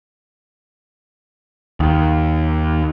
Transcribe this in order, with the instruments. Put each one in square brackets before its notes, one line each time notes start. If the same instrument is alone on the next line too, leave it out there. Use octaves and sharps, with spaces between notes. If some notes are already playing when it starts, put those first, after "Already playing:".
[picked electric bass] D#2